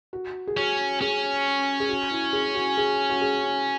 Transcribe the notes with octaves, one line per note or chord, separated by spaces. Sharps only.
F#4
G#4
C#4 F#4
C#4 G#4
G#4
F#4
E4
G#4
F#4
G#4
F#4
G#4